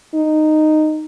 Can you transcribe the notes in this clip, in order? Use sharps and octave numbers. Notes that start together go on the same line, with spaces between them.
D#4